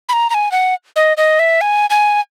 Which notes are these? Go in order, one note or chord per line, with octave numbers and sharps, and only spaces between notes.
B5
A#5
A#5
G#5
F#5
D#5
D#5
E5
G#5
G#5